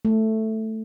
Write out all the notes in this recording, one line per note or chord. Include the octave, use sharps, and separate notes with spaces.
A3